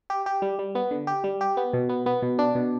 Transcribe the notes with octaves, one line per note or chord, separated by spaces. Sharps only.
G4
G4
G3
G3
B3
D3
G4
G3
G4
B3
B2
B3
B3
B2
D4
B2